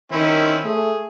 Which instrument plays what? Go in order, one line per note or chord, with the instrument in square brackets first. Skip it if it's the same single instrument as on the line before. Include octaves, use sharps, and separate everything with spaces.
[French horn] D#3 [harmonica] C4 C#4 E4
[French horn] A3 [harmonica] G#4